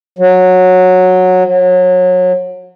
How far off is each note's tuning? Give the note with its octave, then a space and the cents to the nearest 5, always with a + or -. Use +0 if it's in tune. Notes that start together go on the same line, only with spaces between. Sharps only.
F#3 -10
F#3 -30